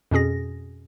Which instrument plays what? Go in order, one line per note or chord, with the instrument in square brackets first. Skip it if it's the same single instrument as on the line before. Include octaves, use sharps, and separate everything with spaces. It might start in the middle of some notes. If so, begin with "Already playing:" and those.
[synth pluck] F2 B2 C#4 G#4 A#6